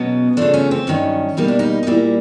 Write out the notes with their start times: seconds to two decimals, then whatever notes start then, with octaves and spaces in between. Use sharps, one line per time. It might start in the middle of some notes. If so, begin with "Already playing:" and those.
Already playing: B2 F#3 B3 C#4
0.37 C#3 F3 A3 D4
0.54 C#4
0.71 C4
0.87 G2 D#3 F#3 C#4
1.37 B2 G3 A#3 D#4
1.48 D4
1.59 D#4
1.83 D#4
1.87 A#2 G3 A#3 E4